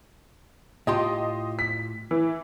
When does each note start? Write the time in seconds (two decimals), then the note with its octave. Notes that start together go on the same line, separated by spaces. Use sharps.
0.87 A2 F4 G4 D#5 C6
1.59 B6
2.11 E3